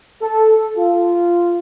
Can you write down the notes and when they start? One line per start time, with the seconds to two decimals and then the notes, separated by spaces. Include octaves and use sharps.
0.22 A4
0.77 F4